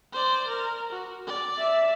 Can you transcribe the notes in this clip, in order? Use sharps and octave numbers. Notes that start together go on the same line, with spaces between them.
C5 D5
A#4
F#4
D5
E5